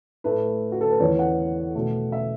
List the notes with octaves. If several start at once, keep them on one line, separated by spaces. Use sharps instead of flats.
A2 A3 B4
F#4
A4
B4
E2 E3 B3 C#5
F#5
B2 A3
E5